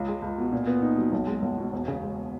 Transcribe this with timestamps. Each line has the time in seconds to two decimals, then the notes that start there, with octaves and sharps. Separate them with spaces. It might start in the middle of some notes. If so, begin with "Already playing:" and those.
Already playing: C#2
0.08 G#3
0.22 C#2
0.38 B2
0.53 A#2
0.67 B3
0.82 D#4
0.98 F#3
1.12 B1
1.27 G#3
1.42 B1
1.58 B2
1.73 E1
1.88 C#3
2.03 G#3